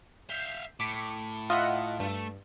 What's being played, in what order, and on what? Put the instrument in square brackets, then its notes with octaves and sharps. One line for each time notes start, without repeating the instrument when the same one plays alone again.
[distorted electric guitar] E5 F5 [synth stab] G6 C7
[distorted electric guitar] A2 [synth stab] D6 B6 C#7
[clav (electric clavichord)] F4 [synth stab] D#5 E5 F#5
[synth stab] G2 [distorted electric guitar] A3